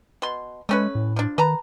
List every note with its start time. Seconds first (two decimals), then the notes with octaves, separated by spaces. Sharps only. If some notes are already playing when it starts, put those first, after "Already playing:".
0.22 B2 C6
0.69 G#3 A3 C#4 B4
0.95 A2
1.16 F3 D4
1.38 D#3 B4 A5 A#5